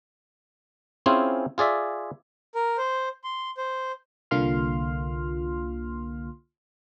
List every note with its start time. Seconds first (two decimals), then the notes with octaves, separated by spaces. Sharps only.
1.06 C4 C#4 E4 F4 G#4 C5
1.58 F4 G#4 D5 E5
2.55 A#4
2.77 C5
3.24 C6
3.57 C5
4.31 C2 D3 A#3 F4 C6 F6